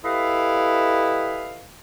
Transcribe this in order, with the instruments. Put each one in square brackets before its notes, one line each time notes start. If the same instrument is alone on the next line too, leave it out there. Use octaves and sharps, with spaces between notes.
[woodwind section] E4 G4 A4 B4 D#5 F5